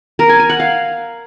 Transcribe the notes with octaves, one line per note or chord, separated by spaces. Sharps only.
A#4
G#5
G#5
F#5
F5